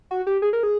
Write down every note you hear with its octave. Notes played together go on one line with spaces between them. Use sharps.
F#4
G4
G#4
A#4
G#4